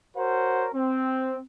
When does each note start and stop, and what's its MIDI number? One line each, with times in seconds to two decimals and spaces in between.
0.16 0.68 66
0.16 0.68 70
0.16 0.68 72
0.16 0.68 73
0.16 0.68 78
0.73 1.40 60